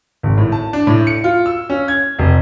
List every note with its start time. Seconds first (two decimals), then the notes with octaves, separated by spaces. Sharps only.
0.23 G#1
0.38 A2
0.52 A5
0.73 D4
0.87 A2
1.07 C#7
1.24 F4
1.46 E6
1.70 C#4
1.88 G#6
2.19 F1